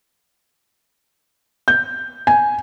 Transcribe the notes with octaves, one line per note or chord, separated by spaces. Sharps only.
G6
G#5